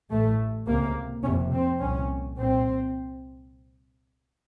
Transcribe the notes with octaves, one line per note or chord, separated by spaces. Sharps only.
A1 A2 A3
C#2 C3 A#3
F1 F2 C3 C#4
C4
C2 A#2 C#4
C2 A#2 C4